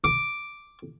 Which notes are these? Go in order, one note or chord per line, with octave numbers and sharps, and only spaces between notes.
D6